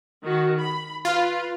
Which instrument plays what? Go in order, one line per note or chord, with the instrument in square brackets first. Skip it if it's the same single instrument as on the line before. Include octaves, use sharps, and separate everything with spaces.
[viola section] D#3 F#4
B5
[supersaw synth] F4 [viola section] B4